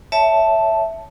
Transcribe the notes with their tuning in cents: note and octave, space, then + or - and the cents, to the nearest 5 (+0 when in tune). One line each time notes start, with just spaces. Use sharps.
C#5 +20 E5 +0 A5 +0